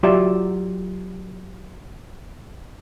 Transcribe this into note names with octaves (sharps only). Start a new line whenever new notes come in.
F#3 F4 G4 D5 E5